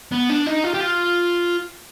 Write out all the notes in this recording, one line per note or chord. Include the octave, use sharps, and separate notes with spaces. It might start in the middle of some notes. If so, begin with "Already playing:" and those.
B3
D4
D#4
F4
G4
F4